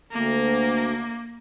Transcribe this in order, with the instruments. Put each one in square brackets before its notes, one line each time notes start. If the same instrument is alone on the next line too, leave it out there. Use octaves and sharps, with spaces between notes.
[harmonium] D2 [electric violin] A#3